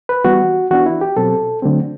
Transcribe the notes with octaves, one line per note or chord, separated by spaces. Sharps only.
B4
E3 G3 B3 F#4
E3 B3 D4 F#4
E4
G4
B2 F#3 C4 A4
D3 F#3 A3 C4